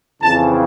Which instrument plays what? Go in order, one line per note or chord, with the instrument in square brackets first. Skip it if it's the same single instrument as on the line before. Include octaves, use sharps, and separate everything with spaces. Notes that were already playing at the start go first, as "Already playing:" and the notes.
[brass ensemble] F2 C#3 E3 A5